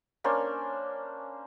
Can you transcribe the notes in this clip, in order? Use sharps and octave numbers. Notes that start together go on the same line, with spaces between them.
A#3 C#4 D4 C5